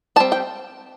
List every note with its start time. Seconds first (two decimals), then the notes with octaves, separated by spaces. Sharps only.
0.16 G3 A5
0.20 C4
0.32 G5